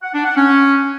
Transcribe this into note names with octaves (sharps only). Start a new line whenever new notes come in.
F#5
D4
F#5
C#4